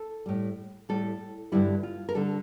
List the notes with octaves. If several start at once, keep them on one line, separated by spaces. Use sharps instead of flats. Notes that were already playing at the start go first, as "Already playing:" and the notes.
Already playing: A4
A2 G3
A2 G3 A4
G2 D3 G3 E4
F4
A#4
D3 G3 A4